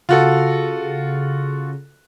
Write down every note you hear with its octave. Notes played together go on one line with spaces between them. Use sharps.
C#3 F4 F#4 A4